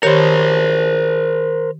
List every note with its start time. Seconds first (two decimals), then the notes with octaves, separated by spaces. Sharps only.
0.03 D#3 G4 A#4 C5 C#5